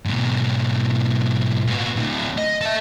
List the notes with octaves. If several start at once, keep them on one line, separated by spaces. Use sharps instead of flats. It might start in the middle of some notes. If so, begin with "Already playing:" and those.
G#2 B2
A#2 B3
D2 A2
D#5
A4 E5